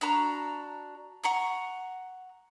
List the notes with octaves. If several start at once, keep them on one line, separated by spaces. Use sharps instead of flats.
D4 F#4 A#5 B5
F#5 A#5 C#6